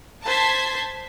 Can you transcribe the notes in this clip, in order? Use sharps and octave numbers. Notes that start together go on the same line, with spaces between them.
C5 A5 G#6 B6